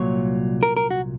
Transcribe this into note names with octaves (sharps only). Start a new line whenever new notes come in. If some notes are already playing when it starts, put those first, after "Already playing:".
Already playing: C2 A#2 F#3 C#5
A#4
A#4
F#4